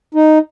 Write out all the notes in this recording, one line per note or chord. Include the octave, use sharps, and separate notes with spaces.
D#4